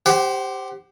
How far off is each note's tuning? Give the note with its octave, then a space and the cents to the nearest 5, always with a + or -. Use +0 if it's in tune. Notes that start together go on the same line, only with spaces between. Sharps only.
G4 +5 C5 +0 F#5 +40